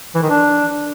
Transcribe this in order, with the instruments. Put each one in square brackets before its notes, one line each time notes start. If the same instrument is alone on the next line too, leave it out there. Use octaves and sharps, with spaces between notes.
[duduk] E3
D#3
D4